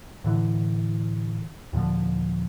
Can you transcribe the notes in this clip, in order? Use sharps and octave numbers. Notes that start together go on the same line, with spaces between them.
A2 D3 E3
D#2 A#2 D3 F3